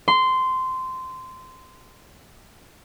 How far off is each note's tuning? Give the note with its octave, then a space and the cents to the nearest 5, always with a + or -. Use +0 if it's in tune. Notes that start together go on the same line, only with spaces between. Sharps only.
C6 -15